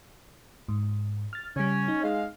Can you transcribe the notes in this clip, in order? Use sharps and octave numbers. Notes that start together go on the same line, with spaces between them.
G#2
F6 A6
C#3 G3 C#4
D#4
G#3 F5